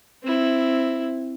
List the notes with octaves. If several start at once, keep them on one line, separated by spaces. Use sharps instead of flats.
C4 E4